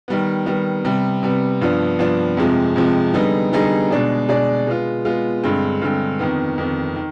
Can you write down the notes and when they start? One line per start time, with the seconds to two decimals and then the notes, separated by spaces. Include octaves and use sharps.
0.08 D#3 G3 B3
0.46 D#3 G3 B3
0.84 C3 G3 B3
1.23 C3 G3 B3
1.61 G2 F3 B3 D4
1.99 G2 F3 B3 D4
2.37 F2 C3 F3 G#3
2.76 F2 C3 F3 G#3
3.14 D3 G3 B3 D#4 G#4
3.52 D3 G3 B3 D#4 G#4
3.90 B2 G#3 D4 G#4 D5
4.28 B2 G#3 D4 G#4 D5
4.67 G#3 B3 F4
5.05 G#3 B3 F4
5.44 G2 D3 G#3 C4
5.82 G2 D3 G#3 C4
6.19 F2 D#3 B3
6.58 F2 D#3 B3
6.96 D#3